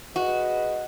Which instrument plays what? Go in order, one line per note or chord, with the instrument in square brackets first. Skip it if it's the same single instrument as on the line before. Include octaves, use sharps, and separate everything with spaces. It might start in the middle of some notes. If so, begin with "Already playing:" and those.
[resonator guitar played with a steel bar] F#4 [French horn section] G#4 B4 D#5